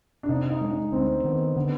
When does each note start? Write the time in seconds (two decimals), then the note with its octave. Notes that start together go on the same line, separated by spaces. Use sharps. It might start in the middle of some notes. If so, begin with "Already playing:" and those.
0.23 D4
0.29 C3 D#4
0.50 D#4
0.61 G#3
0.71 D#4
0.92 D2 C4
1.24 D#3 B3
1.56 D3 B3